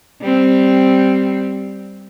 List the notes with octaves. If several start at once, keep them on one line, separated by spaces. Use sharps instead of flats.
G3 C4